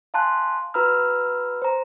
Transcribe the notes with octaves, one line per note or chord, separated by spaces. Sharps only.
F5 G#5 A5 C6 F#6
F#4 B4 A#5 B5 E6 F6
C5 A#5